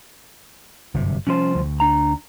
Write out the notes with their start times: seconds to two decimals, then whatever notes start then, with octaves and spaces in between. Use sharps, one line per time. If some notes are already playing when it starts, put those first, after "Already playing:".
0.94 G1 F#2 C3
1.27 C2 F3 C#4 C5
1.55 D2
1.80 D4 A#5